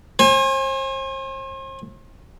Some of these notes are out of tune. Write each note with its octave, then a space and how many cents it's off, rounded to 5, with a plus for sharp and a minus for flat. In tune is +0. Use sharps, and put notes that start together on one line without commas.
C5 +40 G#5 -20